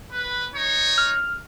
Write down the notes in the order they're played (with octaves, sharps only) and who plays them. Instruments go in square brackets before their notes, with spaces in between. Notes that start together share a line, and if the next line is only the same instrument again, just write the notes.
[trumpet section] B4
D#4 C#5
[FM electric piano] F6